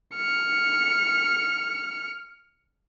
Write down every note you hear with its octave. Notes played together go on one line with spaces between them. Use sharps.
F6 C#7